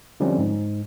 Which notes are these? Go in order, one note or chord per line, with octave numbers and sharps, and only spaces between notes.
D3 F3 G3 C4 C#4
G#2